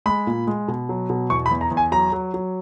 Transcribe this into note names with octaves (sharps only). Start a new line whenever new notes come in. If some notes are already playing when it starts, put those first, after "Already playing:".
G#3 B5
A#2
G#3
B2
F#3
B2
E2 C#6
B5
E2
A#5
E2
G#5
F#3 A#5
F#3
F#3